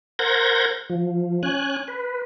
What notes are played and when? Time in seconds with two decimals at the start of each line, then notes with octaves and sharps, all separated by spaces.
0.19 A#4 C5 F#5 G6 G#6 A#6
0.90 F3
1.43 C#4 G#5 F#6
1.88 B4